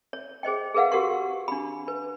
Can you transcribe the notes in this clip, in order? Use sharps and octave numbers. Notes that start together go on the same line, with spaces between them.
C#5
G#4 C5 D#5 G5
G#4 A#4 B4 F5 F#5
F#4 G4 A#4 F#5 C#6
D4 B5
B4